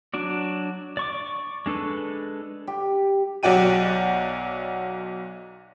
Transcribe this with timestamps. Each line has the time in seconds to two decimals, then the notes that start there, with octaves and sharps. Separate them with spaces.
0.14 F#3 D4 F#4 D5
0.97 D5 C#6 D6
1.66 G#3 D4 A4 B4
2.67 G4
3.43 B1 F#3 F#4 D5 G5 D#7